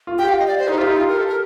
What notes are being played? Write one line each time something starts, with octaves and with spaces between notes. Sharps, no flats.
F4
G4 G5
F5
D#5
D5
C5
D#4
F4 G4
D#4
F4
A#4
A4
A#4